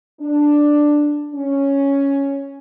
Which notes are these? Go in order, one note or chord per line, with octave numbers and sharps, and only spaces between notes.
D4
C#4